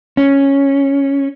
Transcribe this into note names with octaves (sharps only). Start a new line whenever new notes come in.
C#4